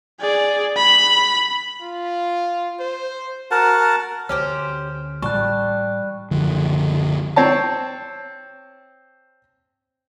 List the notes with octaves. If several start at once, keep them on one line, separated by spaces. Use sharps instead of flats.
G#4 D5
B5
F4
C5
F#4 A#4 F#5 A5
D2 C#4 G4 C5 F6
A1 G3 A5 C#6 F#6
F#1 B1 D3 F3
C4 C#5 A5